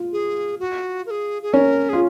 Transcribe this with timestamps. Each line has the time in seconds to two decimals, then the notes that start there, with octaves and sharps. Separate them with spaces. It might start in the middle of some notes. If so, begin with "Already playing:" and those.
Already playing: F4
0.13 G#4
0.60 F#4
1.06 A#4
1.11 G#4
1.43 G#4
1.53 C#4 A#4
1.89 F4 G#4